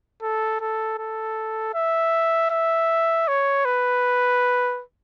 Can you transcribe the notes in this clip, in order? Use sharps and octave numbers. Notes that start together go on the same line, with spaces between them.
A4
A4
A4
E5
E5
C#5
B4